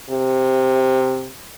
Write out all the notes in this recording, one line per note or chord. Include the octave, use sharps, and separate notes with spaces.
C3